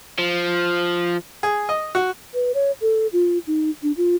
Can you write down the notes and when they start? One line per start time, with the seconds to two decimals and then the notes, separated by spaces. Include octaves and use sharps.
0.19 F3
1.43 G#4
1.69 D#5
1.95 F#4
2.34 B4
2.54 C#5
2.82 A4
3.13 F4
3.47 D#4
3.83 D4
3.97 F4